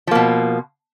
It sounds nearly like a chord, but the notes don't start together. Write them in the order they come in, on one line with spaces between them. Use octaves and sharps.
F3 A#3 B2